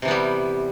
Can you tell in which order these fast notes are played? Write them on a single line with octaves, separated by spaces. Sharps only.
C3 E3 B3 G3